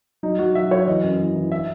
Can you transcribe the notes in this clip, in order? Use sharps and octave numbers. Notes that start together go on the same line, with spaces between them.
F#3 D#4
F#3 F#4
F#3 E5
F#3 C#5
E3 D#5
F#2
E3
E3
E5